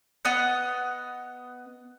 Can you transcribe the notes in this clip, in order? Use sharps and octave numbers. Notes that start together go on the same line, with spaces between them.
B3 D#5 F#5